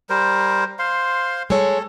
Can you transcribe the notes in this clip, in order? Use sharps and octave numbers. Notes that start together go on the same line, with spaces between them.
G3 A#4 C5
C5 F5 C6
G#3 A4 C#5